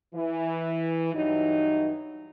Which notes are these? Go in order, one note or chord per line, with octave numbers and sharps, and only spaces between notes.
E3
G2 E3 F#3 D#4